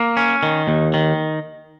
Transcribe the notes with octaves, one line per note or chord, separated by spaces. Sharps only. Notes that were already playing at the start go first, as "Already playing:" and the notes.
Already playing: A#3
C#4
D#3
D#2
D#3